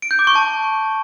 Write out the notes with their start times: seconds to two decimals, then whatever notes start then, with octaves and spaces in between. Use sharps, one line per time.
0.02 D7
0.11 G6
0.19 D6
0.27 C#6
0.35 A5